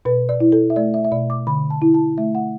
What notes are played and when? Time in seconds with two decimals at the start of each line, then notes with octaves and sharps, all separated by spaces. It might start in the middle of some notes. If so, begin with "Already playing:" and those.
0.05 B2 B4
0.29 D5
0.40 E4
0.52 A4
0.70 E5
0.76 A3 D5
0.94 E5
1.05 E5
1.12 B2 D5
1.30 D6
1.47 D3 B5
1.70 A5
1.82 E4
1.94 A5
2.18 A3 E5
2.35 F#5